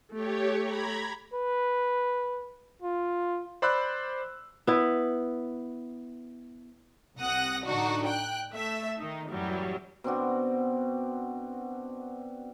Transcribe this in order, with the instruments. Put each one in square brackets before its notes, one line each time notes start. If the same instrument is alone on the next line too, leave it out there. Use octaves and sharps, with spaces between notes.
[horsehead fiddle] A3 [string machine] G4 C#5
[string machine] A#5 B5 G#6
[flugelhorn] B4
F4
[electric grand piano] C5 D5 B5 C6 E6 F#6
[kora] B3 E4
[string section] C2 C3 F#5 D#6 F#6 A#6
A2 D3 D4 D#4 F#4
G5 F#6
A3 E5
D#3 D#4
F#2 A2 E3 F#3 G3
[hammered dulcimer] B2 C4 D4 F#4